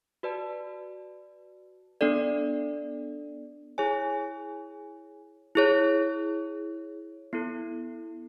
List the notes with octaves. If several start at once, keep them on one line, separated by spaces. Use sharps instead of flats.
F#4 B4 D5 A5
B3 D4 A4 D5
E4 G#4 C#5 G#5
E4 G#4 C#5
B3 E4 A4